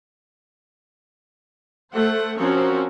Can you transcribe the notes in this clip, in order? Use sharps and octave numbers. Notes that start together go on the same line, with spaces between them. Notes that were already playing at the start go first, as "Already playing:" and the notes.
A3 C5 F#5
F3 C4 C#4 F#4 A#4 C#5